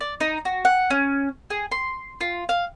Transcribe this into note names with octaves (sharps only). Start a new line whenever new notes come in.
D5
D#4
F#4
F#5
C#4
G#4
C6
F4
F5